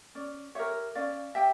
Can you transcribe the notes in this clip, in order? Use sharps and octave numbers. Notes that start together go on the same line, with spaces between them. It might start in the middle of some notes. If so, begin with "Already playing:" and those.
C#4 D5
G4 A#4 C#5 E5
C#4 D5 F5
G4 E5 G5